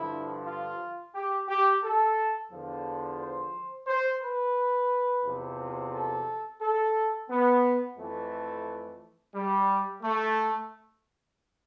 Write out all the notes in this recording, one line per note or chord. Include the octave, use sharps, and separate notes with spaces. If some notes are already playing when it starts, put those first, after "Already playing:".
Already playing: G2 D3 F3 E4
F4
G4
G4
A4
E2 D3 F3
C5
C5
B4
E2 C3 F3
A4
A4
B3
F2 E3 A3
G3
A3